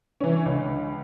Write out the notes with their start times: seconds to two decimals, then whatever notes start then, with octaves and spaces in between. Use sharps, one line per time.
0.21 E3 C#4
0.45 C#2 D3